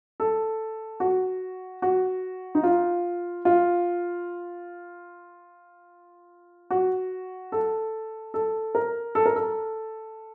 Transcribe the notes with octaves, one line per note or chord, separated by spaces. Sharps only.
A4
F#4
F#4
D#4
F4
F4
F#4
A4
A4
A#4
A4
A#4
A4